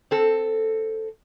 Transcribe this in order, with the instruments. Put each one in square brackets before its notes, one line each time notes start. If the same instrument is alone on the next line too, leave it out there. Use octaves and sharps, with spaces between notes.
[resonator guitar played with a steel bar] C4 A4